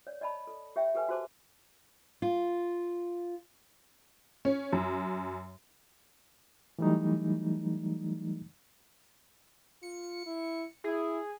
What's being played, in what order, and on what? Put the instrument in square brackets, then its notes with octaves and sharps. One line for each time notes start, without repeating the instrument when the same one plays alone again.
[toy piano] C#5 D5
D5 D#5 A5 B5
A4
G4 C#5 E5 G5
G4 A4 B4 G#5
F#4 G#4 C5 A5 D6
[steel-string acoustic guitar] F4
[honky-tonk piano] C#4
F#2
[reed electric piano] E3 F#3 G3 A3 D#4
[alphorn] F4 [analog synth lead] C#7
[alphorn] E4
[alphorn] E4 [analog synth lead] G#4